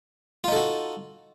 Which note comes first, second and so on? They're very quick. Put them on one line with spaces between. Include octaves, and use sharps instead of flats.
F4 D#4 A4 F#4